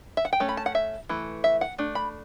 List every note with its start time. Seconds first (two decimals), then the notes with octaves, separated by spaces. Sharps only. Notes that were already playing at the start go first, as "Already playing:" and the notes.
0.17 E5
0.25 F#5
0.33 G5
0.40 A3 C#4
0.49 B5
0.57 A5
0.66 F#5
0.75 E5
1.09 E3 A3
1.44 E5
1.61 F#5
1.78 A3 D4
1.95 B5